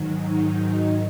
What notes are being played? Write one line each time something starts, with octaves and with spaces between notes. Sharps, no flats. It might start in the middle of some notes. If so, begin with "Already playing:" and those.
Already playing: G#2 D#3 F#3
D#4
D#4